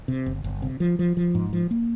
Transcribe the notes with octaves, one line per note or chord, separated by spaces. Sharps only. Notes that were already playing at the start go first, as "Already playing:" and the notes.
C3
G1
G1
C3
F3
F3
F3
G#2
F3
A#3